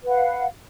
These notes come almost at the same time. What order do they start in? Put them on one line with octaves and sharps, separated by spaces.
B4 F#5 F5